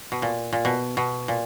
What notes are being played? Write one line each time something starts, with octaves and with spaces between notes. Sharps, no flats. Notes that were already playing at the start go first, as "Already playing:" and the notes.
B2
A#2
A#2
B2
B2
A#2